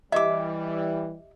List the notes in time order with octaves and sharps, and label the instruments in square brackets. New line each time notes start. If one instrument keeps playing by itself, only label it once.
[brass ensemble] E3 G3 [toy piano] G4 D#5 [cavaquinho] E5 D6